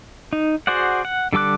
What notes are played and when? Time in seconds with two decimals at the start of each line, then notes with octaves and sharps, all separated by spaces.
0.33 D#4
0.67 F#4 G#4 C5 D5 F#5
1.05 F#5
1.33 D3 G3 A4 D6 F#6